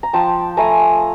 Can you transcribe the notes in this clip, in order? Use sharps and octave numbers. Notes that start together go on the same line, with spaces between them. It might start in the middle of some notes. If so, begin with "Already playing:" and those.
A#5
F3 G5 A5
A3 G#5 A#5